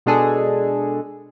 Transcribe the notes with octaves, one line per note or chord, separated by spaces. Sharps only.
B2 G#3 D4 G#4 A4